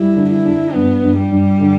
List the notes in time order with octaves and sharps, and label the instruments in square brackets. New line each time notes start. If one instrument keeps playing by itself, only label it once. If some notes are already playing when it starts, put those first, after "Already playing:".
Already playing: [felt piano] G3 [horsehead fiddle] E4
[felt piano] D3
[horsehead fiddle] E4
[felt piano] D4
[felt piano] G2 [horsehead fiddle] B3
[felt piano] G2
[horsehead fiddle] G3
[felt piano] G2
D3